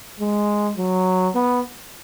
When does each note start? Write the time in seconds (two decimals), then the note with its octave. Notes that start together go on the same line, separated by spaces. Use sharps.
0.20 G#3
0.77 F#3
1.35 B3